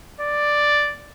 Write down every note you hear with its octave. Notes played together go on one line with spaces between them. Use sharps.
D5